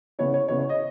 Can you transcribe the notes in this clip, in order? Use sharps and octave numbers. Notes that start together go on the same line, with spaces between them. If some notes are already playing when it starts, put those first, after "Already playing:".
C#3 E3 B3 C#5
C#5
C#3 E3 B3 C#5
C#5
D#5